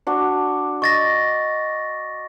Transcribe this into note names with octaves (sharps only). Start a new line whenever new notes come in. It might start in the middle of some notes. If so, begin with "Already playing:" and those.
D4 F#4
D#5 C#6 A6 A#6